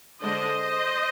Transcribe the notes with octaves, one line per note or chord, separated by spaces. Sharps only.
D3 G#3 D4 C5 D#5